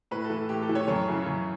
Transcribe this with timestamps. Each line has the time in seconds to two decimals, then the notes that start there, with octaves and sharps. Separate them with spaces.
0.11 A2 B4
0.24 A4
0.30 E3
0.37 A4
0.49 A2 G4
0.62 A4
0.69 E3
0.75 C#5
0.88 F#2 C#5
1.07 C#3 E3
1.26 F#2